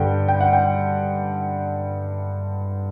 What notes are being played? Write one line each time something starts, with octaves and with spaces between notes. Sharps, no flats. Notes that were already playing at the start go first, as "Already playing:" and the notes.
Already playing: G2 D3 G3 G5
G5
F#5
G5